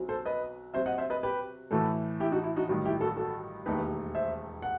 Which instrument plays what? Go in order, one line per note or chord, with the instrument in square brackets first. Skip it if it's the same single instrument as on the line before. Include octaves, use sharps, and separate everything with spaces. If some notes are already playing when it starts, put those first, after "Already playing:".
Already playing: [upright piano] B1 B2 F#3 C4
[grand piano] A4 C5
B4 D#5
[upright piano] C3 F#3 C4 F#4 [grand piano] C5 E5
[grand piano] D#5 F#5
C5 E5
B4 D#5
G4 B4
[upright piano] A2 E3 A3 [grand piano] F#4 A4
[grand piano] E4 G4
D#4 F#4
E4
D#4 F#4
[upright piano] A1 G2 D#3 F#3
[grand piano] E4 G4
F#4 A4
F#4 A4
[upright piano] E1 D#2 D#3 A3 D#4 [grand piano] G4 B4
[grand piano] C5 E5
F#5